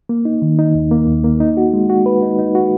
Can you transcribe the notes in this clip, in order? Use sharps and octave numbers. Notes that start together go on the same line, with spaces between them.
A#3
D#4
D#3
D#4
D#2
A#3
D#2
A#3
D#4
F#4
G#3
F#4
B4
D#4
D#4
F#4